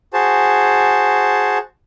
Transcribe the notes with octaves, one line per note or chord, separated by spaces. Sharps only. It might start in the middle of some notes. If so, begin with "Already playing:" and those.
F#4 G#4 C5 A5